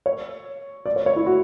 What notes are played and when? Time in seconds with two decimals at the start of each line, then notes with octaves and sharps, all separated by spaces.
0.06 C#5
0.86 D5
0.96 C#5
1.06 C#5
1.16 E4
1.26 F#4